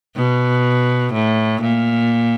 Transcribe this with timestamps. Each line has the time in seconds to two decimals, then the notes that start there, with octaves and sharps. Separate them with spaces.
0.15 B2
1.13 A2
1.61 A#2